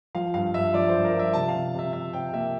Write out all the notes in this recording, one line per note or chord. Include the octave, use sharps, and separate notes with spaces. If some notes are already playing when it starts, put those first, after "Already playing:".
F3 F5
G2 F5
G2 E5
F3 D5
G2 C5
A#4
F3
E5
C3 A5
F5
C3
C3 E5
C3 E5
C3 G5
A#3 E5